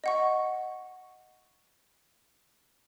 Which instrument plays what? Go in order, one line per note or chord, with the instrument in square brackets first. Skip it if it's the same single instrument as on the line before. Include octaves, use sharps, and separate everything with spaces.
[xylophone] D#5 F#5 C#6